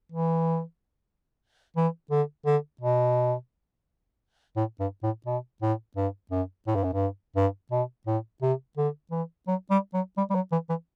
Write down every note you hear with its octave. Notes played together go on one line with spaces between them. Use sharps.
E3
E3
D3
D3
B2
A2
G2
A2
B2
A2
G2
F#2
A2
G2
F#2
G2
G2
B2
A2
C3
D3
E3
F#3
G3
F#3
G3
G3
F#3
E3
E3